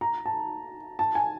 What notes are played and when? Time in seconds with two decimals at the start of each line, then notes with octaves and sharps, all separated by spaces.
0.01 A#5
0.26 A5
0.99 A5
1.15 G#5